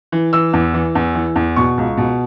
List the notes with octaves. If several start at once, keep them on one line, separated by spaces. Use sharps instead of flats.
E3
E3 E6
E2
E3
E2
E3
E2
B2 C#6
C#2
B2